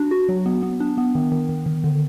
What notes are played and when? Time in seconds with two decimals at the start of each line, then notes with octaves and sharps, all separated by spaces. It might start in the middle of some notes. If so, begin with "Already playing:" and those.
Already playing: D4 F#4
0.11 F#4
0.29 F#3
0.46 B3
0.63 B3
0.80 D4
0.97 B3
1.15 D#3
1.32 D#3
1.49 D#3
1.66 D#3
1.84 D3